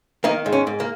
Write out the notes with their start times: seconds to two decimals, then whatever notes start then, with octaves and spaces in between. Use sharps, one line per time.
0.24 D#3 A#3 D#4
0.46 G#2
0.52 C#4
0.67 G#2
0.80 A#3